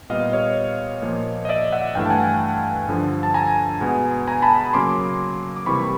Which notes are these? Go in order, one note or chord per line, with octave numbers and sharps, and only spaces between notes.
A#2 G3 B3 D#5 F5
C#5 D#5
A#2 F3 A#3
D#5
D5 E5
E5 F#5
G2 E3 A3 F5 G5
A5
F#5 G#5
G2 D3 F3
A5
G#5 A#5
B2 G#3 B3
G#5 A#5
A5 B5
C#3 F#3 A#3 C6 D6
D6
C3 E3 G3 A#3 B5 C#6